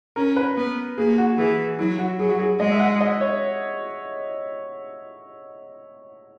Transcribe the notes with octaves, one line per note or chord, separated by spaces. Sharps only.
C#4 A#4
B4
B3
A#3 G#4
F#4
E3 G#4
F#3 E4
F#4
F#3 G#4
F#4
G#4
G#3 D#5
E5
F#5
D#5
C#5